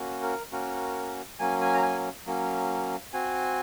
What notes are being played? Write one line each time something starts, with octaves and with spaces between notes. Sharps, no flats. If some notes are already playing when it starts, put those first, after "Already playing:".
Already playing: A#3 C#4 F#4
A#4
A#3 C#4 F#4 A#4
F#3 A#3 C#4 G#5
G#5
A#5
G#5
F#3 A#3 C#4
C4 F#4 G#5